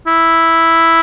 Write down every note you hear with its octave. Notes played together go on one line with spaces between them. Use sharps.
E4